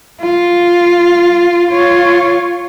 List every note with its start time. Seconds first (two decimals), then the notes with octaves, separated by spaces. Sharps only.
0.21 F4
1.71 F4 C#5